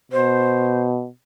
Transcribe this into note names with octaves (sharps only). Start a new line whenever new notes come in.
B2 C5